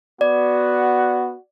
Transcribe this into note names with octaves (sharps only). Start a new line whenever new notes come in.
B3 F#4 D5